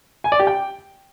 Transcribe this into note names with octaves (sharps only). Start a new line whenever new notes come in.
G#5
D5
G4
G5